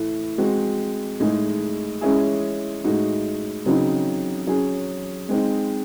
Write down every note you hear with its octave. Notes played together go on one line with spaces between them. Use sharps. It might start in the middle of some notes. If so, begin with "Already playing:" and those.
Already playing: A2 E3 A3
G#3 C4 F#4
A2 G#3 D#4 G#4
G#3 C#4 E4 G#4
A2 G#3 D#4 F#4
C#3 F#3 C4 D#4
F#3 C#4 G#4
G#3 C4 D#4